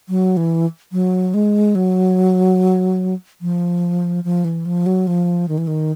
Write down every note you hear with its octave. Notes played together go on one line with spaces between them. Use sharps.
F#3
E3
F#3
G#3
F#3
F3
F3
E3
F3
F#3
F3
D#3
E3
D#3